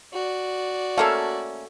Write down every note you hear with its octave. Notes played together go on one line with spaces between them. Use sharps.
F#4 D5
A3 A#3 C#4 A4 F5